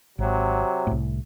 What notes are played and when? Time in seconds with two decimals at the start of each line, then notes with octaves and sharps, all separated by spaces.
0.19 G#1 C3 F#3
0.87 C2 A2